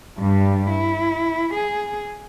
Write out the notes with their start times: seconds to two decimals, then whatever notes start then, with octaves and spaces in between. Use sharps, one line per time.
0.19 G2 G3
0.70 E4
1.54 G#4